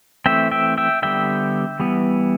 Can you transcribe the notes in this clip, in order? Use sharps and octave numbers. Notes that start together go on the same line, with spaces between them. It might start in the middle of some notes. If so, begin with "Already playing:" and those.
E3 A3 C4 E5 G5
E5 G5
E5 G5
D3 G3 B3 E5 G5
E3 G3 B3